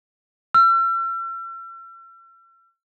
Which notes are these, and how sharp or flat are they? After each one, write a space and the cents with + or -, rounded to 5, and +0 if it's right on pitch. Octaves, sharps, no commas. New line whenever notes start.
E6 +45